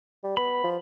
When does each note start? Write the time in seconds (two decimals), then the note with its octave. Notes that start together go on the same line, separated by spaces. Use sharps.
0.24 G3
0.37 B3 B5
0.64 F3